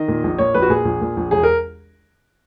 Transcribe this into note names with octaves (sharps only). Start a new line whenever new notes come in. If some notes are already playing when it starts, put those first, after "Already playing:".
Already playing: D#3 D#5
A#2
A#1
A#2 C#5
A#1 B4
F#4
A#2 G#4
A#1
A#2
A#1
E1 G#4
A#4